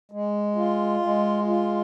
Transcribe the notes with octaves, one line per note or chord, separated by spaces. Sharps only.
G#3
F4
G#3
F4